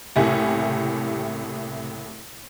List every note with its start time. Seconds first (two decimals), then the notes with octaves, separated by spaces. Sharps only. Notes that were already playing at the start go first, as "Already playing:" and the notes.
0.16 F#1 C2 A2 E4 G4 G#5